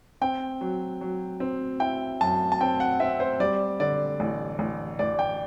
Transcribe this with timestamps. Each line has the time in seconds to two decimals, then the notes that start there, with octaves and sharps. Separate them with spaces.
0.21 C4 G5
0.61 F#3
1.01 F#3
1.40 C4
1.80 E4 G5
2.21 F#2 A5
2.52 A5
2.60 C4 G5
2.80 F#5
3.00 C4 E5
3.20 C5
3.40 G3 D5
3.80 D3 D5
4.20 A1
4.59 A1
4.99 A1 D5
5.19 G5